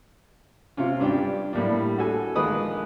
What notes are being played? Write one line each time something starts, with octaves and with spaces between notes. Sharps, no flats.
C3 C4 C#4 F4
G2 D4 G4 D5 G5
A2 G3 A#3 D4
F#4 A4 G#5
A#1 D#3 G#3 B4 D#6